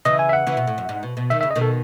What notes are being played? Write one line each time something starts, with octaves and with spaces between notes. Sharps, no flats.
C#3 E3 D#5
G#5
E5
F#5
C#3 E3
B2
A2
F#2
G#2
B2
B2
D#3 E5
C#3 E5
D#5
B2 D#3
A4